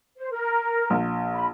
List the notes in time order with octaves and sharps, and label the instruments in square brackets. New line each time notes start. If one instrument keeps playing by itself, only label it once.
[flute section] C5
A#4
[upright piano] A#1
[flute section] B5